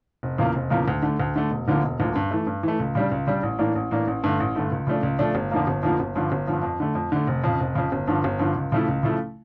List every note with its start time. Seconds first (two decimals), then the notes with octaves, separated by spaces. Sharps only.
0.23 F1
0.38 E2 C#3 F3 A#3
0.55 F1
0.70 E2 C#3 F3 A#3
0.88 D2
1.02 D3 A3
1.20 D2
1.36 D3 A3
1.51 E1
1.68 D2 D3 F3 A#3
1.83 E1
2.00 D2 D3 F3 A#3
2.15 G2
2.31 E3 A3
2.47 G2
2.63 E3 A3
2.80 C#2
2.95 C#3 G3 D4
3.11 C#2
3.27 C#3 G3 D4
3.43 A1
3.59 A2 E3 A#3 D4
3.76 A1
3.91 A2 E3 A#3 D4
4.08 A1
4.24 G2 D3 A3
4.40 A1
4.56 G2 D3 A3
4.72 C#2
4.87 C#3 F3 A3 D4
5.03 C#2
5.19 C#3 F3 A3 D4
5.35 G1
5.51 F2 D3 F3 A#3
5.67 G1
5.83 F2 D3 F3 A#3
6.00 G1
6.15 G2 D3 F3
6.32 G1
6.47 G2 D3 F3
6.63 F2
6.80 D3 A3
6.95 F2
7.12 D3 A3
7.27 F1
7.44 F2 C#3
7.60 F1
7.75 F2 C#3
7.92 G1
8.07 G2 D3 F3
8.24 G1
8.39 G2 D3 F3
8.56 C#2
8.72 C#3 F3 A3 E4
8.88 C#2
9.03 C#3 F3 A3 E4